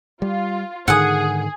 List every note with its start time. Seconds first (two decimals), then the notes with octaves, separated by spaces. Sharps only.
0.22 G3 F4
0.88 G#2 D3 D#3 G#4 F#5 D#6